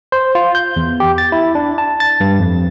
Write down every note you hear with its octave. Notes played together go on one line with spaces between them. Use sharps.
C5
F4
G6
E2
G4
A6
E4
D4
A5
A6
G2
F2